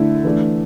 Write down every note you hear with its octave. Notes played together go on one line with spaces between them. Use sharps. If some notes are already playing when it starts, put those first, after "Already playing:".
Already playing: D3 A3 E4 A4
E3 A3 D4